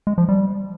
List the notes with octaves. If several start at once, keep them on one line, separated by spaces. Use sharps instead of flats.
G#3
F3
G3